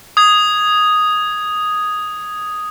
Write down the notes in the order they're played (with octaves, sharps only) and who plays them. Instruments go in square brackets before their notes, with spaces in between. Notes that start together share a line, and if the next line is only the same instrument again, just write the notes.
[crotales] D#6 G#6